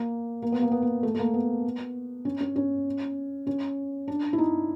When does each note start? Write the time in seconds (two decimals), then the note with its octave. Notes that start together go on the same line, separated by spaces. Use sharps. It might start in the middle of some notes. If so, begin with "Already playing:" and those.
Already playing: A#3
0.42 A#3
0.52 B3
0.62 A#3
0.72 B3
0.82 A#3
1.03 A3
1.15 A3
1.19 A#3
1.34 B3
2.25 C#4
2.41 C#4
2.56 C#4
3.47 C#4
4.08 D4
4.33 E4
4.38 D#4